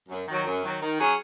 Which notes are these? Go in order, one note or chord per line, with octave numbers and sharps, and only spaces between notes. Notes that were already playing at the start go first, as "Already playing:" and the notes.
F#2
D#3 F#3
F#2
D#3 F#3
D#3
F#3 C#4 G#4 C#5